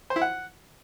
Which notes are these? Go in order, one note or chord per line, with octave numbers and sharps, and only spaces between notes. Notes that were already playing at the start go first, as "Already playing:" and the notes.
C5
E4
F#5